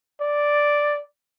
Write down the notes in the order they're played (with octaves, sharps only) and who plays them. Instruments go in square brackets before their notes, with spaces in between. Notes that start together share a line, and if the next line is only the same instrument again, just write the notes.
[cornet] D5